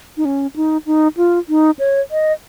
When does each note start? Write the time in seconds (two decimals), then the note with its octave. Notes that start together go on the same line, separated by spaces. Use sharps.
0.17 D#4
0.25 C#4
0.56 D#4
0.86 D#4
1.17 F4
1.49 D#4
1.79 C#5
2.11 D#5